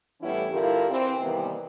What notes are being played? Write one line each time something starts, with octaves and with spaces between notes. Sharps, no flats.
A2 E3 G3 B3 C#4 E4
G2 D3 E4 F4 G4 A#4
E3 C4
C3 D#3 E3 G3 A#3 B3